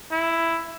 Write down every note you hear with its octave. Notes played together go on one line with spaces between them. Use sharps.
E4